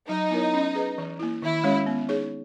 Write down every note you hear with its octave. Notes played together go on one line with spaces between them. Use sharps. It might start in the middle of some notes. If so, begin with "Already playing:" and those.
F#3 D#4
B3 E4 A#4 C#5
C#4
G#4 B4
E3
A#3 E4
D#3 E4
G#3 C#4 F#4 C#5
B3
D#4 G#4 C#5